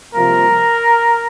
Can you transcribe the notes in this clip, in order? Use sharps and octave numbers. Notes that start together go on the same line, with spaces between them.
C2 C3 F3 A#3 A#4